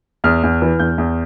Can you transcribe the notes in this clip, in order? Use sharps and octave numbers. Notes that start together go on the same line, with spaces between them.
E2 F6
E2
E3
E2 G6
E2